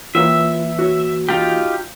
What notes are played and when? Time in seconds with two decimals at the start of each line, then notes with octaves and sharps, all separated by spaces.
0.15 E3 A#3 F4 B4 C#5 E5 G5
0.79 F#4 C#5
1.29 D#4 F4 G4